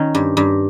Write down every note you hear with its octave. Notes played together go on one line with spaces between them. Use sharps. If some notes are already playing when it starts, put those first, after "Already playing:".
Already playing: D#3 C#4 D#4
G2
G2